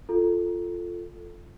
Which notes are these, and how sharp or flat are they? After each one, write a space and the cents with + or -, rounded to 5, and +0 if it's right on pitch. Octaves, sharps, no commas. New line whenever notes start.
F4 +0 A4 +0